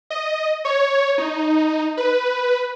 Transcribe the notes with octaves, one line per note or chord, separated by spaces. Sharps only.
D#5
C#5
D#4
B4